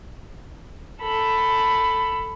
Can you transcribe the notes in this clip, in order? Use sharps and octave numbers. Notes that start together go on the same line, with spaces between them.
A4 B5